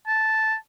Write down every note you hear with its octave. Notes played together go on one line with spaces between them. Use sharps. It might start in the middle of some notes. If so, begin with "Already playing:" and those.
A5